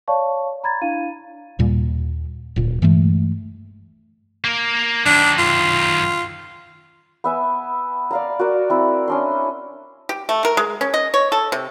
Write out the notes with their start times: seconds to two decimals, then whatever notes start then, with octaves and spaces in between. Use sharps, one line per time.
0.08 C#5 D5 F5 A5 C#6
0.64 A#5 B5 G#6 A6
0.82 D4 E4 F5 D#7
1.59 D#2 A#2 G3
2.56 D1 A#2
2.82 G2 E3 G#3 A3
4.44 A#3 A#4
5.06 F#2 D#3 D4
5.38 F4
7.24 B3 E5 G#5
8.11 D5 F5 A#5
8.39 F#4 A#4 D5
8.70 C4 E4
9.08 C#4 D4 C6
10.09 G4
10.29 A3
10.45 A#4
10.57 G#3
10.81 C#4
10.94 D#5
11.14 C#5
11.32 A4
11.52 C3